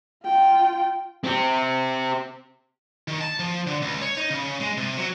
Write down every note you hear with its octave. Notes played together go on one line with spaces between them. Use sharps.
F4 G5
C4 G4
D#3
A5
F3
D3
C#2
C#5
D#4
C#3
G#3
C3
F#3